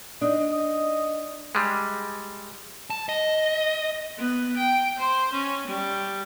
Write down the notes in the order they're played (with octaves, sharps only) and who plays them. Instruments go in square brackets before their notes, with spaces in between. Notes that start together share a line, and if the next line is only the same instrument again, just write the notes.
[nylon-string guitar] D4 D#4 [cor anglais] D#5
[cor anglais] D#5
[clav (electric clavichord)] G3 G#3
[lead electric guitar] A5
D#5
[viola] B3
G5
C5
C#4
G3